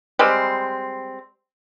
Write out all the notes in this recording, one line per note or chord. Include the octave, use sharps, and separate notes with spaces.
G3 G#3 C4